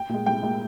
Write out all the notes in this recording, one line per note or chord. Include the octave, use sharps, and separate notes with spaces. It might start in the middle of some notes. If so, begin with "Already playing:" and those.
Already playing: G5
A#2 G#3
C2 G5
A#2 G#3